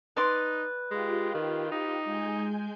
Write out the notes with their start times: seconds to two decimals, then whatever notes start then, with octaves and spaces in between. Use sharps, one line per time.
0.17 D#4 B4 D5 C6
0.91 G#3 F4 G4
1.34 D#3
1.72 D#4
2.05 G#3 G#5 G6